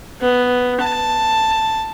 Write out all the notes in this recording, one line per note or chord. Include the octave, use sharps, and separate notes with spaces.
B3
A5